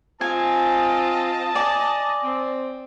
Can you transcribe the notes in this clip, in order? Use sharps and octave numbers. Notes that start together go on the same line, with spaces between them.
C4 F4 D#5 G#5 A5
D5 G#5 D6
C4